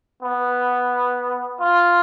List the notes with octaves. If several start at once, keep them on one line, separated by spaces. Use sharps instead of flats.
B3
F4